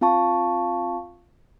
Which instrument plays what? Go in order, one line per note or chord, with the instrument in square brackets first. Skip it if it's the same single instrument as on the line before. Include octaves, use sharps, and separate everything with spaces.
[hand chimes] C4 F4 F5 A5 C#6